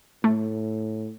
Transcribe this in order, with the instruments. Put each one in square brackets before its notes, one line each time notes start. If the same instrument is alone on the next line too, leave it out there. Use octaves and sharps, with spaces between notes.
[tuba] A2 [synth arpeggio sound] A3